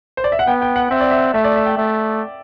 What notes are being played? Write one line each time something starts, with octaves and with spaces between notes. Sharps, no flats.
C5
D5
E5
F#5
B3 G5
G5
F#5
C4 E5
D5
E5
A3 E5
D5
E5
G5
A3